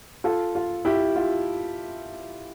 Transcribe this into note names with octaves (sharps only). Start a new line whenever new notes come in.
F4 A4
F4
E4 G4
F4